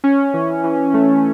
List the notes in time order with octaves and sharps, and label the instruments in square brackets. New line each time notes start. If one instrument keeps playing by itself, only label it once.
[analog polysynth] C#4
E3
E3
A3